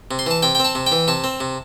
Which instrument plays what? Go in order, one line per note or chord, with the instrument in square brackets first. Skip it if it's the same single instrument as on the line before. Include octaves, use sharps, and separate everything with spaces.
[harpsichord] C3
C6
E3 A5
C3 G5
C4 G5
A5
C3
G5
E3
C3 A5
C4
C3